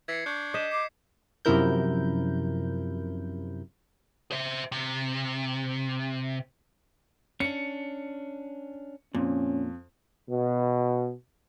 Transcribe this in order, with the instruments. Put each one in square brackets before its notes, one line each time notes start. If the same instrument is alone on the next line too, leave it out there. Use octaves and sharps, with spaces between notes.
[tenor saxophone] E3 [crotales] G#6 C7 C#7
[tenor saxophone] D4 [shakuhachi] C#6 [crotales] G6
[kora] D#5 [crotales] G6 B6 E7
[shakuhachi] D6 [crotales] C7
[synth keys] F#2 C3 F3 E4 A#4 G6
[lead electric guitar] C5 E5
C3
[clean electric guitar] C#4 D4 [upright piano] C#7
[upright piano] F2 [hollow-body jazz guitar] A#2 [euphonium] C#4
[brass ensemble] B2